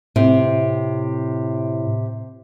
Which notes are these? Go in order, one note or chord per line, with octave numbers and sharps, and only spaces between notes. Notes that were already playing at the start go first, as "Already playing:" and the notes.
A2 C3